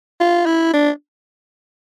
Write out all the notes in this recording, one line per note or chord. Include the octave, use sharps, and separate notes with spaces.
F4
E4
D4